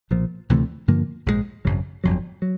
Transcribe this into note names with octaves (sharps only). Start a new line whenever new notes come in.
B1 A#2 F3
D2 C3 E3 A3
G2 D3 F3 A#3
A#1 G#2 D#3 G#3
G#1 F#2 C#3 F#3
G1 F2 D3 F#3
F#3